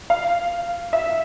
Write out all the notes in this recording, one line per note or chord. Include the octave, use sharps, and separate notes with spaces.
F5
E5